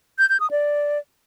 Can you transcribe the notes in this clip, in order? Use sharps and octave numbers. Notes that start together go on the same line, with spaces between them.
G6
G6
D#6
D5